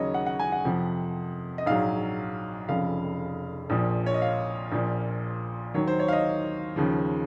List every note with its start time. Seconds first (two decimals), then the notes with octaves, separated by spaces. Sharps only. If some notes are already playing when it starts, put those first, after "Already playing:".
Already playing: D#2 C#3 F#3 C#5 D#5
0.14 F#5
0.26 F#5
0.39 G#5
0.52 F#5
0.65 F2 C3 F3
1.58 D#5
1.66 A#1 G#2 F#3 F5
2.68 F1 F2 C#3 F3 F5
3.70 A#1 A#2 F3
4.06 C#5
4.14 D#5
4.22 F5
4.72 A#1 A#2 F3
5.74 D#2 D#3 F#3 C#5
5.87 C5
5.99 C#5
6.08 F5
6.13 D#5
6.76 D#2 C#3 F3